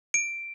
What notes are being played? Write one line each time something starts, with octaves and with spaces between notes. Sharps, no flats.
D7